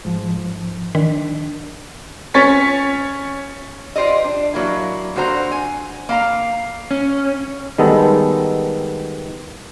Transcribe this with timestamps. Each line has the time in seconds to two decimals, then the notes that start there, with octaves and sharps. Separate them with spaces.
0.05 G#2 F3
0.95 D#3 D4
2.34 C#4 C#5 A6 B6
3.96 F4 G4 C5 D5 D#5
4.24 D4
4.54 F#3 A#3 E4
5.16 A#2 D3 F#4 C5 A#5
5.52 G#5
6.09 A#3 F5 A#5
6.91 C#4
7.78 D#3 G3 G#3 B3 D#4 A4